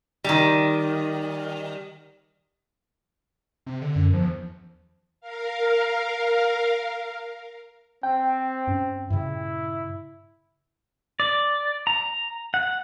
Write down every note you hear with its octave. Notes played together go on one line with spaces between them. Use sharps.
D#3 G3
C3
D3
F#2
E2 F3
A#4 F5
C4 G5
G2 C#4
G2 A#2 C#3 E4
D5
A#5
F#5